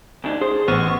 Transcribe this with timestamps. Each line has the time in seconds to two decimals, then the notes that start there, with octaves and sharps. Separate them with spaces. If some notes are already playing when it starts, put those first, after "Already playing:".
0.24 D2 D4 D#4
0.41 G#4 C5
0.68 A1 B3 C#6 F6 D#7